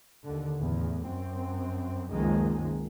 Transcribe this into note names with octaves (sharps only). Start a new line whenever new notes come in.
D#2 D3
A1 E2
F#2 C4
C#2 F#2 D#3 F3 G#3 A#3